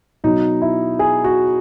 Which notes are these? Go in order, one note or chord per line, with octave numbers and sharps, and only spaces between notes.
B2 F#3 D#4
E4
G#4
F#4